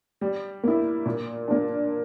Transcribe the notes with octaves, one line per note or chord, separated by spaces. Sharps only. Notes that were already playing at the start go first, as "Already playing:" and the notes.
G3
A#3 E4
A#2
A#3 D4